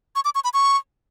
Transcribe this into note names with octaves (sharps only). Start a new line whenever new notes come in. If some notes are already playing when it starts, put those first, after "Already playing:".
C#6
D6
C#6
B5
C#6